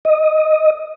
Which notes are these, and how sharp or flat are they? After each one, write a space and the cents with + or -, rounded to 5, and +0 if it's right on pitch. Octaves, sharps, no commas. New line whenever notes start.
D#5 +0